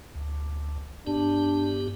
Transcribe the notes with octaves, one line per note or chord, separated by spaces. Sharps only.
D2
G2 B3 D4 G4